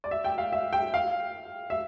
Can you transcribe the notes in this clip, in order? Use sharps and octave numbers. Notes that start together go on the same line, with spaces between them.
D5
E5
G5
F5
E5
G5
F5
E5